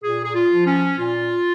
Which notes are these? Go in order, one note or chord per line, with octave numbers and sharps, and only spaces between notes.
A#2 G#4
G#4
F4
F3
C#4
A#2 F4